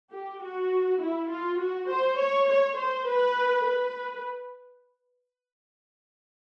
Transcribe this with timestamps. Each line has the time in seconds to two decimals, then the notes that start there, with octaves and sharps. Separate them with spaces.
0.11 G4
0.41 F#4
1.01 E4
1.30 F4
1.59 F#4
1.89 C5
2.19 C#5
2.48 C#5
2.78 C5
3.07 B4
3.66 B4